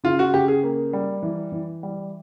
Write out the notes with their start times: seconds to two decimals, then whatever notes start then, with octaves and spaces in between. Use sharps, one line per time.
0.04 C#3 F4
0.19 F#4
0.34 C#3 G4
0.48 G#4
0.63 A#3
0.93 G3
1.23 E3
1.52 E3
1.83 G3